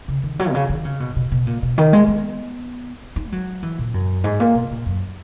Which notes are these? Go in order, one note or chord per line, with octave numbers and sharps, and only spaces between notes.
C#3
D#3
F#3
B2
C#3
D#3
C#3
B2
B2
B2
A#2
B2
D#3
G#3
B3
D#4
G#3
F#3
E3
A#2
F#2
G#2
A#2
B2
A#2
F#2